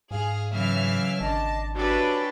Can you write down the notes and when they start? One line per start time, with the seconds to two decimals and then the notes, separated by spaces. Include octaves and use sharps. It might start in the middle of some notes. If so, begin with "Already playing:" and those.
0.11 G#2 G#4 F5
0.53 C#3 E3 F#3 E5 F5 F6
1.21 G#1 D4 D#5 A5
1.74 C#4 D4 E4 F#4 G4 A4 B4